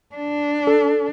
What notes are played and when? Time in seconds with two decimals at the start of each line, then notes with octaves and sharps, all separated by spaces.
0.16 D4
0.67 A4